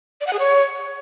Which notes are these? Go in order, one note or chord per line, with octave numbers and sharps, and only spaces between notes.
D5
F#5
G#4
C#5